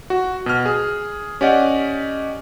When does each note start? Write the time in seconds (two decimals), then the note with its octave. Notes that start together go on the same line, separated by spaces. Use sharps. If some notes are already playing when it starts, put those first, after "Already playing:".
0.10 F#4
0.46 B2 F6
0.65 G#4
1.41 C#4 G4 D5 D#5 F#5